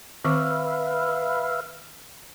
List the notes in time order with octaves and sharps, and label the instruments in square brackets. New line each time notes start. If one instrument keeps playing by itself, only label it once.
[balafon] D#3 C4 C#6 [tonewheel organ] B4 E5 F5